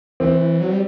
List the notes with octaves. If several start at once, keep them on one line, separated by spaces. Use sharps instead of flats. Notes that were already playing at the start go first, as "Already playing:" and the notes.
E3 C4
F#3
G3